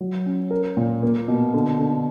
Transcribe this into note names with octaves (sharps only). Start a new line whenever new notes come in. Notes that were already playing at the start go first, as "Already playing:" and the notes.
F#3
C#4
A#4
A#2
A#3
B2
D3
D3